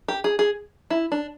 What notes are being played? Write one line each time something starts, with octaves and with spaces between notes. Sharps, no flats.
G4
G#4
G#4
E4
D4